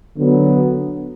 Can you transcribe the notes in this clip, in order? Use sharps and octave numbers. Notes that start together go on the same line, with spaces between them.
D3 F#3 B3